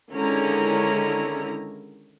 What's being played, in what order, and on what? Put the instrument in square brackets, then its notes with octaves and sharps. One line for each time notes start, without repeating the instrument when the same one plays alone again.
[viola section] D3 D#3 G#3 C#4 E4 A#5